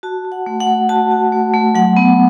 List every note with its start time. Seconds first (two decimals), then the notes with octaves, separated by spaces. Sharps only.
0.03 F#4 A5
0.25 F#4
0.32 F#5
0.46 A3
0.60 F#5
0.67 A3
0.89 F#4 A5
1.11 F#4
1.32 A3
1.53 A3
1.75 F#3 F#5
1.97 B3